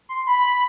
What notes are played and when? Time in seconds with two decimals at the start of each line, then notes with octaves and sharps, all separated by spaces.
0.09 C6
0.27 B5